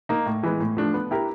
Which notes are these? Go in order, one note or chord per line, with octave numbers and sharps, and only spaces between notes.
A#3 D#4
A2
E3 G#3 B3
A2
F3 A3 D4
B3
E4 G4 A#4